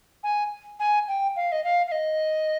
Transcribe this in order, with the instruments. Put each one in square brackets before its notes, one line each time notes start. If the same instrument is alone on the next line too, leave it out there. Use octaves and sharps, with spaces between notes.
[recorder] G#5
G#5
G5
F5
D#5
F5
F5
D#5